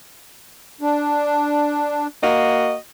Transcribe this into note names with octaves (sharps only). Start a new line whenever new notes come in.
D4
A#3 F#4 D#5